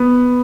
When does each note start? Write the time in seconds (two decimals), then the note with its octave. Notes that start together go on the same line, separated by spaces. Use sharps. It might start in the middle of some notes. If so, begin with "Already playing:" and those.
Already playing: B3